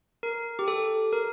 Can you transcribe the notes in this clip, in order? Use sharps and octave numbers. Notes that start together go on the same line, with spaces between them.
A#4
G4
A4
A#4